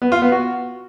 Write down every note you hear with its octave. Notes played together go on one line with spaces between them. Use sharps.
B3
F4
B3
F#4